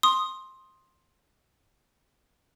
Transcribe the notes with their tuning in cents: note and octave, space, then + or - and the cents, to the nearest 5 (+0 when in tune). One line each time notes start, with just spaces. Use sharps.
C6 +10 D#6 +0